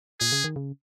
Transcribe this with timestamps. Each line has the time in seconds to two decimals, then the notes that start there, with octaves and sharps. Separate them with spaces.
0.20 A#2 G#4
0.32 C#3
0.44 D#3
0.56 C#3